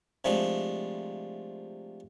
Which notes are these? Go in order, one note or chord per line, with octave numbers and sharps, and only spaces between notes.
C3 F3 G#3 A3 D4